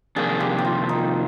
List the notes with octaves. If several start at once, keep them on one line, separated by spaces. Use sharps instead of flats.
F2 C3 D#3 A#3 D4 G#4
G4
G4
F4
D#4